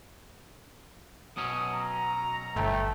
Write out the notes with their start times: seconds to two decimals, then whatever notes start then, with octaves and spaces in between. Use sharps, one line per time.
1.37 B2 F#3 C#4 D#6
1.73 A#5
2.56 G1 A3 G5